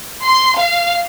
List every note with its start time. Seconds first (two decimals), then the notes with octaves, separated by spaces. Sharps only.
0.24 C6
0.59 F5